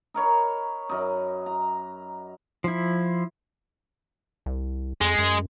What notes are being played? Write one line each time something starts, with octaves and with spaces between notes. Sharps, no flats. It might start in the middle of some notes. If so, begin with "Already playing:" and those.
D#4 A#4 C#5 B5
F#2 D#4
A#5
F3 E4
C2
F2 G#3
F#2